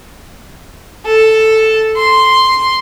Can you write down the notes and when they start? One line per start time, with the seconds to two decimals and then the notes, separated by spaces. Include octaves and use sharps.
1.06 A4
1.97 C6